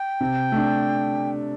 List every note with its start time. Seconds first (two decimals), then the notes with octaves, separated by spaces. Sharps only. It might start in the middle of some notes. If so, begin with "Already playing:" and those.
Already playing: G5
0.21 C3
0.52 A3 D4